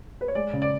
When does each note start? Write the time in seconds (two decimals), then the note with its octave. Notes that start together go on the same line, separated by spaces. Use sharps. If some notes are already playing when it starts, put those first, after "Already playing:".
0.21 B4
0.28 C#5
0.35 G#3 D5
0.53 C#3
0.62 D5